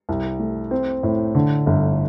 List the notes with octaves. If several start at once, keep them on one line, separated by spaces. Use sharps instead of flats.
C2
A3
C4
A2
D3
G1